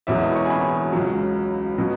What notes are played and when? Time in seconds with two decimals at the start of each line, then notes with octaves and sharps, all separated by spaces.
0.07 E1 E2 B2 F#3 E5
0.36 C#6
0.46 G#5
0.50 B5
0.93 C#2 C#3 F#3
1.78 B2 F#3